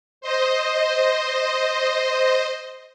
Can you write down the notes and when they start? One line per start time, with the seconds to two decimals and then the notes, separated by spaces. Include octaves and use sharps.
0.21 C5 D#5